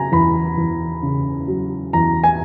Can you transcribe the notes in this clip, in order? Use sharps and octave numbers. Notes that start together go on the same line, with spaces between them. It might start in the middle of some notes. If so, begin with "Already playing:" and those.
Already playing: C#3 F#3 G#5 A#5
E2 B5
E2
C#3
F#3
E2 A#5
G#5